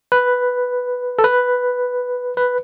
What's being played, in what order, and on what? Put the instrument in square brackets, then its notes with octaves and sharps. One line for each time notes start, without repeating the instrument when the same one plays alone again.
[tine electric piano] B4
A4
B4
B4